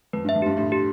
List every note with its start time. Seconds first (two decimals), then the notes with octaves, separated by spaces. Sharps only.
0.13 F2 B4
0.25 G2 E5
0.35 F2
0.42 G2 G4
0.57 A2 G4
0.72 G4